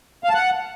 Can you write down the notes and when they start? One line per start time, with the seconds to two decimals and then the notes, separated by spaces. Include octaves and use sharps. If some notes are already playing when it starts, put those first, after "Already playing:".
0.24 F5
0.29 A5
0.34 F#5